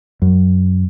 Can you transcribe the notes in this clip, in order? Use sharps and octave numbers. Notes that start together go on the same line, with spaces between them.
F#2